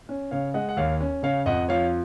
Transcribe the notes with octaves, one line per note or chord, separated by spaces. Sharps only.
C#4
C#3 C#5 F5
G#3 D#5 F#5
F#5
D#2 C#5 F5
C#4
C#3 C#5 F5
F2 D#5 F#5
F3 C#5 F5